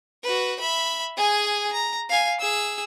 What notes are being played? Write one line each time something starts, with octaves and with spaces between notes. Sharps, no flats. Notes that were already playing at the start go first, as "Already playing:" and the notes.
F#4 B4
E5 B5
G#4 G#5
A#5
F5 G#5
G#4 E6